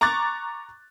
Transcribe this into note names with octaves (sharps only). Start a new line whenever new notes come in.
A#5 C#6 D6 F#6 A6